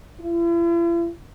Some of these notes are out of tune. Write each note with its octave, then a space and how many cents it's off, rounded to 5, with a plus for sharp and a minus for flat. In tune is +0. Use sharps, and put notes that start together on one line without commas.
E4 +45